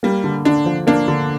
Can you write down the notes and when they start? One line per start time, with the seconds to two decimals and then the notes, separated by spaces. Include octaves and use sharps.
0.03 G3 A#3
0.24 D3
0.45 D3 D4
0.66 F3
0.87 A#3 D4
1.08 D3